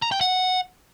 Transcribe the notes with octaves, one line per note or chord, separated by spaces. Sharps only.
A#5
G5
F#5